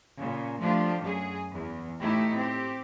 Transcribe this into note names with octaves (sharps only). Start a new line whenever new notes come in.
A#2 C#3
F3 A3 D4 F4 G4
F#2 G#4
E2
A2 A3 D#4 E4 G4
C4 G4